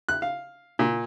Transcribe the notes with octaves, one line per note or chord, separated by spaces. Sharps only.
F#6
F5
A#2